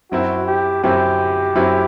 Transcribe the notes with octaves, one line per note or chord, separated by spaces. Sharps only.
F#2 F#3 C4 E4 F#4
G4
F#2 F#3 C4 E4 G4
F#2 F#3 C4 E4